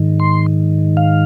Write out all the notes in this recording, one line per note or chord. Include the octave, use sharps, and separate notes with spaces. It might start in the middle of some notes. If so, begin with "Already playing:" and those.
Already playing: G#2 D#3
C6
F5